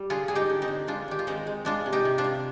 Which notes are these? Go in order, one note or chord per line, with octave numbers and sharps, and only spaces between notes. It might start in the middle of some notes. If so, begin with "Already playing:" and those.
Already playing: G3
D3 F4 G#4
G3 G#4
D#4 G4
D3
C4 D#4
D3
G#3 D4 F4
D#3 G4
F4
G#3 C4 D#4
G#3
G#3 D4 F4
C3
D#4 G4
C3
D4 F4
C3